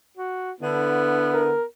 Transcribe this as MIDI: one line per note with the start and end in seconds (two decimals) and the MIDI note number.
0.17 0.52 66
0.61 1.52 50
0.61 1.65 59
0.61 1.52 64
1.34 1.64 70